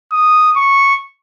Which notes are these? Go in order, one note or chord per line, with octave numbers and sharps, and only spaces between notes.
D#6
C#6